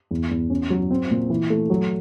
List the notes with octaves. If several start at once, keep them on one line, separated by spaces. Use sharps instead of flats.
E2
E2
C#4
F#3
C4
A#2
E3
A3
F#3